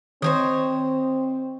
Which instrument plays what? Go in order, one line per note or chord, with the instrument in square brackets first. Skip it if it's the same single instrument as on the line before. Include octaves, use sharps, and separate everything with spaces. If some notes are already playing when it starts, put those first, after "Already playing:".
[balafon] D#3 [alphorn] C4 [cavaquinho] C5 C#5 D#5